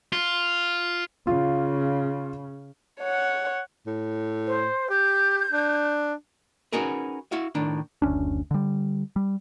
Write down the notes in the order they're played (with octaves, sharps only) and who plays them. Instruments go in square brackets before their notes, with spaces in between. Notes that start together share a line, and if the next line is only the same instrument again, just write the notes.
[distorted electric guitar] F4
[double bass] C#3 [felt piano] F4
[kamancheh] C#5 F#5
[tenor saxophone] A2
[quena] C5
[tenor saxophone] G4 [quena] G6
[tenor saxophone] D4
[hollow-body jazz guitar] C#4 D#4 F#4 G#4 A#4 B4
E4 F#4 F5
A2 D#3 D4
[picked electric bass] F#1 D2 C#4 D4
D3 G3
G3